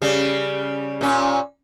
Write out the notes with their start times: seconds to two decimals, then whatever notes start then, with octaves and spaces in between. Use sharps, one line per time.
0.02 C#3 G3
1.01 A#2 C#4